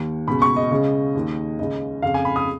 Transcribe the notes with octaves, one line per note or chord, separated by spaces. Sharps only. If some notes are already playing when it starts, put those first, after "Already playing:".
Already playing: D#2 D#3
C#2 B2 B5
C#6
D#5
C#2 C#3
D#2 D#3
C#2 C#3 D#5
F2 C#3 F5
G#5
B5
D#6